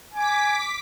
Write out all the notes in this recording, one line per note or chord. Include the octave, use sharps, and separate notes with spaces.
G#5 D6 B6